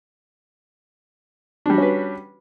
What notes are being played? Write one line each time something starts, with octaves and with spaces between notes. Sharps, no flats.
G3 C#4 D4 F#4 B4